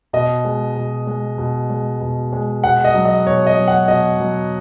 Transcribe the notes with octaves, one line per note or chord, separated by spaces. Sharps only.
B2 D#5
G#3
B2
G#3
B2
G#3
B2
G#3
B2 F#5
D#5
F#3
D#5
B2 C#5
D#5
F#3
F#5
B2 D#5
F#3